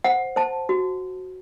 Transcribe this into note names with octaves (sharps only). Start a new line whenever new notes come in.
C5 F#5
C5 A5
F#4